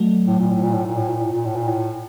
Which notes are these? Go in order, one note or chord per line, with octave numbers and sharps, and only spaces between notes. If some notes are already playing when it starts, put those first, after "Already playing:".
Already playing: F#3 A3
A2
A#2
A2
A#2
A2
A#2
A2
A#2
A2
A#2
A2
A#2
A2